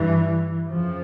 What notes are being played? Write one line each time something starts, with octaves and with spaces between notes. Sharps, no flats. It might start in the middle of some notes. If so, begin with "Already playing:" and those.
Already playing: G2 E3
F2 C#3 F3